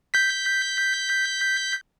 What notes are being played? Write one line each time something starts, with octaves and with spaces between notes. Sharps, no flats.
G6 B6